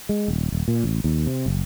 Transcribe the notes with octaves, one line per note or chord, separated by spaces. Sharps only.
G#3
D#1
D#1
A#2
A1
D#2
C3
F#1